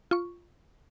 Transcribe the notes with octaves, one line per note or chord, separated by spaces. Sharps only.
F4 C#6